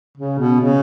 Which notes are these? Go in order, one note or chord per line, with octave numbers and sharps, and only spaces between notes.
C#3
B2
C#3